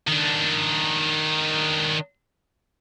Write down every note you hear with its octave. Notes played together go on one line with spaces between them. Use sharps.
D#3 D4